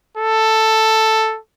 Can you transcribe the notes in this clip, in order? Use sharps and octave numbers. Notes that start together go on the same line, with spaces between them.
A4